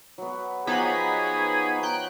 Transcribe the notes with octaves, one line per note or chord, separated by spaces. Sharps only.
F#3 B3
F3 F#3 B3 D#4 G4 G#4 B5
G5 A#5 F#6 G6